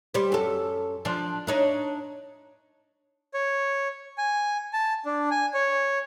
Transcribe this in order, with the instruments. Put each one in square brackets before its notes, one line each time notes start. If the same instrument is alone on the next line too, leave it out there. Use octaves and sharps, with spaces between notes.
[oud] G3 C5
F#2 A4
F3 D4
D4 D#4 C#5
[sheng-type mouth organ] C#5
G#5
A5
D4
G#5
C#5